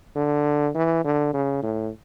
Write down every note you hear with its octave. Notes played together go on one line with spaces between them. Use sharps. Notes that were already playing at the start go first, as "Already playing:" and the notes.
D3
E3
D3
C#3
A2